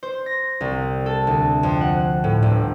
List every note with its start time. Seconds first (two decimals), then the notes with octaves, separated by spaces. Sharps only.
0.03 C5
0.26 A#6
0.61 C2
1.06 A4
1.27 D2
1.63 F2
1.81 F#5
2.24 A2
2.42 G1